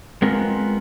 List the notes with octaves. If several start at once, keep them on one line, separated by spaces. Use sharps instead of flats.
G#3 B3 C4 F4 A#4